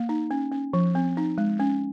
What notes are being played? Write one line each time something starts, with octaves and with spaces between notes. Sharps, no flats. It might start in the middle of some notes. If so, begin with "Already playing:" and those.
Already playing: A#3
D#4
C#4
C#4
F3
C4
D#4
G#3
C#4